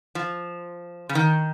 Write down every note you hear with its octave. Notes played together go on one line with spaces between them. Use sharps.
F3
C#3
D#3